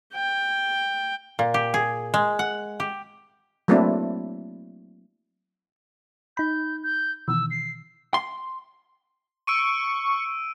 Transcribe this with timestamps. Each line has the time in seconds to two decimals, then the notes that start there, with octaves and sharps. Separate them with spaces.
0.14 G5
1.39 A#2
1.54 G4
1.74 G#4
2.14 G#3
2.39 F#5
2.80 G4
3.68 F#3 A3 A#3 C4 D4 E4
6.37 D#4 B5 G6
6.83 G6
7.28 B2 D#3 E3 E6
7.51 C7
8.14 C6
9.47 C#6 E6 D7 D#7